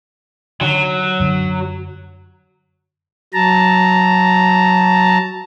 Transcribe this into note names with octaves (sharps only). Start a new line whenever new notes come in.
D3 D#3 F#3
F#2 D3
F#3 A5 A#5